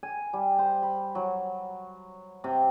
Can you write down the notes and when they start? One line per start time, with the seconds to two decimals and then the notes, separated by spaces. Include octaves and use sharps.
0.03 G#5
0.33 G3
0.59 C5
0.82 B5
1.15 F#3
2.44 C3